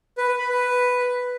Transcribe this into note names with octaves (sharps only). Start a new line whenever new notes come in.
B4
B4
B5
B4